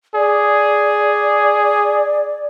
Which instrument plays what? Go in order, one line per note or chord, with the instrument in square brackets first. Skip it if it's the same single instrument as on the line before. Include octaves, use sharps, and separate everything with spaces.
[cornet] G#4 [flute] D5